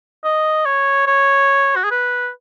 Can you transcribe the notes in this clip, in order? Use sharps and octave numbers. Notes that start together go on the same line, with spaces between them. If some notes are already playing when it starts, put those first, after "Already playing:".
D#5
C#5
C#5
F#4
G#4
B4